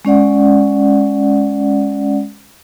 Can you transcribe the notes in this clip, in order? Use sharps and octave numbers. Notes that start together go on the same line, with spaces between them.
G#3 C#4 D5 F#5